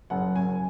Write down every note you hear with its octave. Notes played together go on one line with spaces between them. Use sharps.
F#1 F#5
F#2 G#5